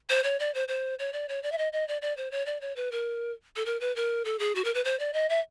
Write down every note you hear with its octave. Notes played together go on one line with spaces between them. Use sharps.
C5
C#5
D5
C5
C5
C#5
D5
C#5
D5
E5
D#5
D#5
D5
D5
C5
C#5
D5
C#5
B4
A#4
A4
A#4
B4
A#4
A4
G#4
F#4
A#4
B4
C5
D5
D#5
E5